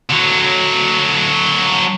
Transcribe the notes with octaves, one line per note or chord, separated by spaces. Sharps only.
D3 F#3